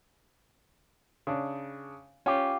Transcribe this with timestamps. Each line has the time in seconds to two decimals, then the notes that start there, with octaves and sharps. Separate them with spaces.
1.27 C#3 D4
2.26 C#4 F4 G4